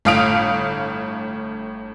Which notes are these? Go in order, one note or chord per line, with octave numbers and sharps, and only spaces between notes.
G1 A2 F5 D#6 D7 F7